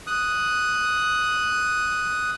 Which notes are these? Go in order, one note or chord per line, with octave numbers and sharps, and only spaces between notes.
D#6 F#6